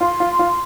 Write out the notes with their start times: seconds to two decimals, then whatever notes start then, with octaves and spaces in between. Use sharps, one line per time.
0.01 F4 C6
0.20 F4
0.39 F4